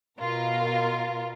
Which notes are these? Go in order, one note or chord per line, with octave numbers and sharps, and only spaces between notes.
B2 F4 A#4